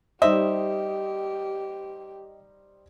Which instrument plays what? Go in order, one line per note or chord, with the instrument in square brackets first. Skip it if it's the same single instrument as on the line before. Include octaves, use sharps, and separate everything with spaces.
[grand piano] G3 D#4 C5 [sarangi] G4 [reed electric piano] D#5 [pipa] E5